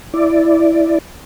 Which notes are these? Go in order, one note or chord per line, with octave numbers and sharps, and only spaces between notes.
E4 D5